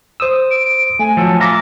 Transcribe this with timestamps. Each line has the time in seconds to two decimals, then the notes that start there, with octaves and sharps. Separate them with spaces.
0.20 C5 D#6 E6
0.51 D7
0.99 A3 G#5
1.17 F3 F#3 A4
1.40 F4 E5 A#5 D6